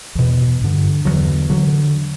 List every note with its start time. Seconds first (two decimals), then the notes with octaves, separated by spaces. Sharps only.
0.15 E2 B2
0.61 G2 D3
1.05 E2 D3 F#3
1.50 D3 F#3